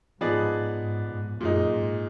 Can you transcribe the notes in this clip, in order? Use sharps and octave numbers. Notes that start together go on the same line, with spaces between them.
G#2 F3 B3 D#4 G#4 D5
G#2
G#2
F#2 A#2 G#3 D#4
G#2